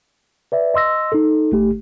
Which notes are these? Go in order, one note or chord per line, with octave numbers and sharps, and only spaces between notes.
B4 D5 E5
D#5 C6 E6 A#6
D#4 A4
G1 A3 G4